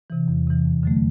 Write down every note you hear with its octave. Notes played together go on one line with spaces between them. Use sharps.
C3 E3
E2
C3 E3
F2
D3 F#3 A3